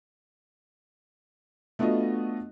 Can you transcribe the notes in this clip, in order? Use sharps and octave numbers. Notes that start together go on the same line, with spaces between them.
A3 B3 D4 F4 F#4 D#5